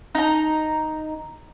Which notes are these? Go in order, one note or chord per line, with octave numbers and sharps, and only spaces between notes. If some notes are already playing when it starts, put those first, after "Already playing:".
D#4 A#5